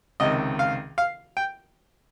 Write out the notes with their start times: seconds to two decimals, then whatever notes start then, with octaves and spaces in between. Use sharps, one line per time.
0.20 C#2 C3 D#3 D#5
0.59 F5
0.98 F5
1.37 G5